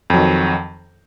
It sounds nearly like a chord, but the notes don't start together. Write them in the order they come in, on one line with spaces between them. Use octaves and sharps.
F2 F#3 D#3